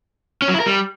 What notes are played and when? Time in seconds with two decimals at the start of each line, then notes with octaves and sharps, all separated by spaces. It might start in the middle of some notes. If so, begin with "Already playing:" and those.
0.42 C#4
0.48 F#3
0.54 E4
0.60 A#4
0.66 G3